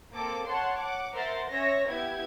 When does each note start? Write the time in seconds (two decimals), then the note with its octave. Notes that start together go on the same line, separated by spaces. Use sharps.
0.13 A#3 C4 A4 D6
0.46 C#5 F#5 A5 C6
0.77 F#5 D6
1.13 A#4 C5 E5 F#5 C6 A6
1.49 C#4 C#5 E5 A#6
1.88 B3 E4 G4 G#6